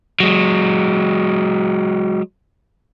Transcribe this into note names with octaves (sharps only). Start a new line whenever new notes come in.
F#3 G#3